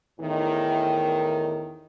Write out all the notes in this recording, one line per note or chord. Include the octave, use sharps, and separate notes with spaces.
E2 A2 D#3